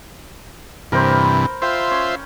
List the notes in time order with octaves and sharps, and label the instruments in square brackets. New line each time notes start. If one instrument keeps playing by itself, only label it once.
[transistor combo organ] G2 C3 E3 [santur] A#4 C5 B5
[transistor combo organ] F4 C5 E5 [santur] G5
[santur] C#4